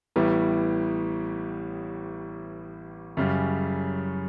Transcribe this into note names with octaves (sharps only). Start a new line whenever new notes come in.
A1 A2 G3 B3
F#2 C#3 G3